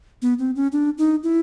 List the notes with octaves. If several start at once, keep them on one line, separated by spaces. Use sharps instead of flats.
B3
C4
C#4
D4
D#4
E4